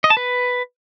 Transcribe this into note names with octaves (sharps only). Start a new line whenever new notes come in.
D#5
A5
B4